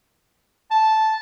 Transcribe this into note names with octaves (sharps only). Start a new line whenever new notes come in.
A5